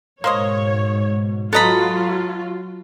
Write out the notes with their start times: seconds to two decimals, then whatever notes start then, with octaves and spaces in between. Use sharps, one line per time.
0.24 G#2 B2 A#3 C5 C#5 D#5
1.53 F#3 B3 F4 F#4 A4 D#5 A#5 B5